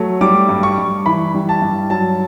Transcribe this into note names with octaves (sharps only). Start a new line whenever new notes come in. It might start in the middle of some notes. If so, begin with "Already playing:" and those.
Already playing: F#3 A3
G3 D6
G2
C#6
G2
E3 B5
G3
A5
G2
F#3 A5